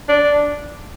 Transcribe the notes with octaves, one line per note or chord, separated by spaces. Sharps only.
D4